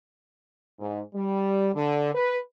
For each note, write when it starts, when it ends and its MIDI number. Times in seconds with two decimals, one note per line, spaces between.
0.79 1.01 44
1.14 1.71 55
1.74 2.11 50
2.15 2.37 71